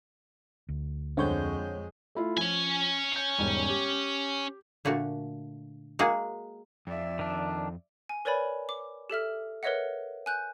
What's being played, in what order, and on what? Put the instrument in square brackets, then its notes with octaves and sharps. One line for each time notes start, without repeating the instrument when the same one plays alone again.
[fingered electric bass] D2
[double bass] F2 G#3 [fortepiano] D3 [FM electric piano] C4 C#5 G6
[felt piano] A3 E4 F4
[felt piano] F3 [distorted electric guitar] C#4 G#5
[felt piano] G6 C#7
E1 G#2 G3
G4
[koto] A#2 D3 A3 F#4
G#3 A#3 F#4 G#4
[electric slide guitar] F2 [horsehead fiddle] D5 E5
[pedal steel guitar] D#3 D4
[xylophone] G#5
A#4 B4 C#5 D5 G#5 B5
D6
G4 A4 E5 F6
A#4 B4 C#5 D#5 E5 F#5
G#5 F#6 G6